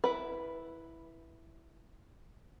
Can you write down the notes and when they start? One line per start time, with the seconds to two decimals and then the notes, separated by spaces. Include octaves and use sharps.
0.04 E4 B4